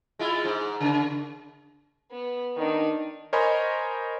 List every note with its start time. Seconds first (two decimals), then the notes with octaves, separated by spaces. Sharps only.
0.19 G#3 E4 F4
0.45 G#2
0.80 C#3
2.11 B3
2.56 D#3 D4 D#4
3.33 A#4 C5 C#5 D#5 G#5 B5